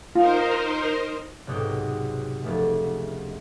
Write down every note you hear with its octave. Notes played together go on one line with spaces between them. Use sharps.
D#4 F4 A#4 C5
B1 G#2 C3 D#4 F#4 G5
F1 C#2 A3